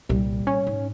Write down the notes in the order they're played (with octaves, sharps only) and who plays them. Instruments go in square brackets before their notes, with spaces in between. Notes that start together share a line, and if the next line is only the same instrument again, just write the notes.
[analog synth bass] C2 [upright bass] A#2 G3
[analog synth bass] C#4
[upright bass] G#2